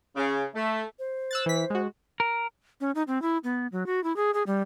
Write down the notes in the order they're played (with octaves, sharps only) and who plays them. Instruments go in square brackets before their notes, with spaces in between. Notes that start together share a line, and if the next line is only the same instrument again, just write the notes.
[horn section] C#3
A3
[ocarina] C5
[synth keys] E6 F#6 A6
E3 B6
G#3 F#4
[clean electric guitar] A#4
[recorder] C#4
D#4
C4
E4
B3
F#3
F#4
E4
G#4
G#4
G3